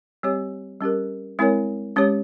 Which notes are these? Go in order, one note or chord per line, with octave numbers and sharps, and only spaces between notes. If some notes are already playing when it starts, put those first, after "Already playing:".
G3 C4 G4 C#5
G3 C#4 G4 A#4
G#3 C4 E4 A#4 C#5
G#3 C#4 G4 C#5